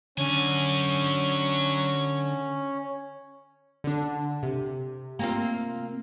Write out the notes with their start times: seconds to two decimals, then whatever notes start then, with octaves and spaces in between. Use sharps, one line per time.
0.18 D3 F#3 C#4 G#5
3.84 D3 D4
4.43 C3
5.19 A#3 C4 F4